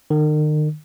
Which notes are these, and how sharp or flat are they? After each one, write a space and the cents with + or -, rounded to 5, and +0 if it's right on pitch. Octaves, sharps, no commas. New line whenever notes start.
D#3 -40